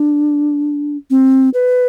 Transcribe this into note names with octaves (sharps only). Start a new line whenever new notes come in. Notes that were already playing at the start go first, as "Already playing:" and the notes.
Already playing: D4
C4
B4